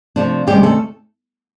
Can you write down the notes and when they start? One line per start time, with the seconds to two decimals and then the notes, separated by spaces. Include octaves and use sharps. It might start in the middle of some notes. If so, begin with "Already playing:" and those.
0.16 C3 F3 A3 D4
0.47 D2 C3 D#3 G3 G#3 C#4 G4
0.63 A3 A4